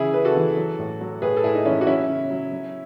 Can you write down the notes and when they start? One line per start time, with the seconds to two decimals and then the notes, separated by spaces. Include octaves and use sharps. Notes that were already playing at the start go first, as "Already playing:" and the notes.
Already playing: C#3 E3 E4 G#4
0.14 C#3 B4
0.25 F#4 A4
0.36 E3
0.57 F#3
0.79 A2
1.01 F#3
1.22 A2 G#4 B4
1.37 A4
1.44 A2 E4 G#4
1.55 D#4
1.65 E3 C#4 E4
1.81 F#4
1.87 F#3 C#4 E4
2.09 C#3
2.30 F#3
2.52 F#3